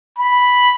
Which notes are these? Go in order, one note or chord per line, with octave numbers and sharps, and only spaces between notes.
B5